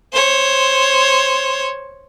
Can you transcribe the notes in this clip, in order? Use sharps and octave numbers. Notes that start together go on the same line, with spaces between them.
C5 C#5